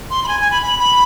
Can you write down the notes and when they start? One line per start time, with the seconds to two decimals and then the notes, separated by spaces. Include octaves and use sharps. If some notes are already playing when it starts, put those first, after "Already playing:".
0.10 C6
0.24 B5
0.28 G#5
0.40 G#5
0.51 B5
0.63 B5
0.79 B5